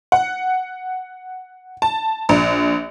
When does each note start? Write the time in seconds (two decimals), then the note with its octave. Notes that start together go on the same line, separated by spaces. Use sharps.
0.12 F#5
1.82 A5
2.29 A#1